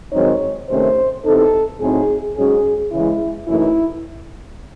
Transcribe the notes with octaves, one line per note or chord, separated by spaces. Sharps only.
G#2 D#3 F#3 C4 D#4 C#5
C3 D#3 A3 C#4 C5
E2 C3 E3 C4 D#4 A4
A2 F#3 C4 D#4 G#4
G#2 F#3 C#4 G#4
C#3 E3 G#3 E4
F#2 E3 A3 D#4 E4